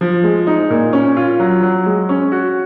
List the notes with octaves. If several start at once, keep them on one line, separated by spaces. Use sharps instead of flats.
F3
G#3
D#4
A#2
C#4
F4
F#3
F#3
G#3
C#4
F#4